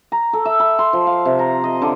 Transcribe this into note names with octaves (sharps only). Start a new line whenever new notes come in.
A#5
A4
E5
B5
C6
F3
F5
C3
A#5
D#5
D3